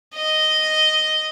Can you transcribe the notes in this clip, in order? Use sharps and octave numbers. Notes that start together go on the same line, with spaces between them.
D#5